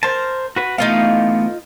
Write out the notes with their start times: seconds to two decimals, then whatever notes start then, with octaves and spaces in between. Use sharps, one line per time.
0.03 A#4 C5 A5
0.56 F#4 B4
0.78 E3 A3 B3 D#4 F4 F5